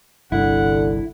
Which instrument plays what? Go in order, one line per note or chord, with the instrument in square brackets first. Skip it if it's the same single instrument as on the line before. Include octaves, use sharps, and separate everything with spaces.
[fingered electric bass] G1 C2 G2 [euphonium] D3 [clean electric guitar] E4 [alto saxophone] F#5